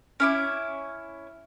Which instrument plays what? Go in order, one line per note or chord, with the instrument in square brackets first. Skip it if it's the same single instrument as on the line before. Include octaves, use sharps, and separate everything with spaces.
[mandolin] C#4 E4 D6